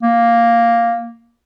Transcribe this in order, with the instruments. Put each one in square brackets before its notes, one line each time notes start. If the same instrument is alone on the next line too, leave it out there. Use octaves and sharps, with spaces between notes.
[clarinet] A#3